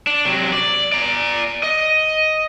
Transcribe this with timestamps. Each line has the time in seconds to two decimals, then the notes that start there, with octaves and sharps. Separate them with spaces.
0.07 D4
0.25 C3 F#3
0.53 D5
0.92 D5 A#5
1.63 D#5